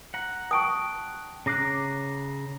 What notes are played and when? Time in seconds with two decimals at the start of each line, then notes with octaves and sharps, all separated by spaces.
0.14 F#5 A#5
0.51 G5 A5 C#6 D#6 D7
1.46 C#3 A#5 D6 F#6 A#6 C7